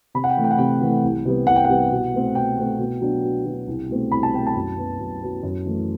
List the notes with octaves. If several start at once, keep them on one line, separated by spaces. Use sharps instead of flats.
C3 B5
F#5
G5
E3 A3
G5
F#5
C3 G5
E3 A3
C2
C3 G3 B3
C2 F#5
G5
C3 G3 B3 F#5
B2
A3 C4
B2 G5
A3 C4
B2
F#3 B3 D4
B2
F#3 B3 D4
C2
B2 A3 C4
C2 B5
A5
B2 A3 C4 G5
A5
F#2
F#3 B3
F#2
F#3 B3
F#2
E3 A3 E4